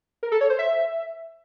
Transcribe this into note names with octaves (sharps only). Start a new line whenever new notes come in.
A#4
A4
C#5
C5
E5